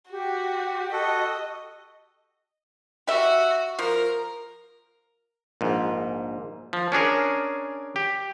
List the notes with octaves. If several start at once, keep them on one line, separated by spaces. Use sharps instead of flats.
F#4 G4
F#4 A4 D#5
F#4 G4 E5
F3 A#4
A#1 G#2
F3
C#4 D4 G#4 A#4
G4